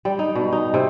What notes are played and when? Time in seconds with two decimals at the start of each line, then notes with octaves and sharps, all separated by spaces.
0.05 G3
0.19 D#4
0.35 B2
0.52 D#4
0.74 C3